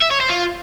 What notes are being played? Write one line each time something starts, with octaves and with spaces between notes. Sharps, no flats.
E5
C#5
C5
F4